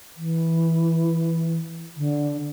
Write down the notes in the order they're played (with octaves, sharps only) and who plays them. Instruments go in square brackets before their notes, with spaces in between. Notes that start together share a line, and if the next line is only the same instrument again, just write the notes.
[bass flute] E3
D3